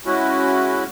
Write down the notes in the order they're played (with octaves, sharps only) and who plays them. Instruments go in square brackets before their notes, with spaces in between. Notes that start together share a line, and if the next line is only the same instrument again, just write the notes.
[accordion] G#3 C#4 E4 F#4